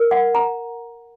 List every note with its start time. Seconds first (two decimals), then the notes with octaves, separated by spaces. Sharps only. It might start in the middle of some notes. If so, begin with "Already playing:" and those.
Already playing: A#4
0.11 F#5
0.35 A#5